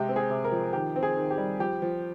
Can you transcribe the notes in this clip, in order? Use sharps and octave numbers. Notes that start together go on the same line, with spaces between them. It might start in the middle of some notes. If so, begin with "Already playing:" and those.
Already playing: C3 G#3 G4
C4
G#4
C3
A#4
F3
D#3 G4
C4
G#4
D#3
G4
G3
F3 G4
F3